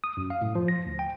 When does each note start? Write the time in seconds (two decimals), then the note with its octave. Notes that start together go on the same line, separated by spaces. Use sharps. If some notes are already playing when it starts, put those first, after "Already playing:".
0.04 D#6
0.17 F#2
0.30 F5
0.42 A2
0.55 F3
0.68 A#6
0.86 D2
0.99 G5